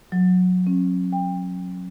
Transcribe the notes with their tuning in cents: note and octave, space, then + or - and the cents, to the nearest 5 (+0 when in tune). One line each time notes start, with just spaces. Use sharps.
F#3 -20
C#4 -40
G5 +25